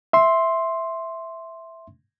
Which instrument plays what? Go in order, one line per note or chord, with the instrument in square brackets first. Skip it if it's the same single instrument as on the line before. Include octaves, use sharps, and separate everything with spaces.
[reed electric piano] E5 C6